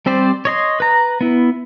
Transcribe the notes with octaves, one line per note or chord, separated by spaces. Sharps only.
G3 C4 G4 C5 D5
C#5 D#5 C6
B4 A#5
B3 E4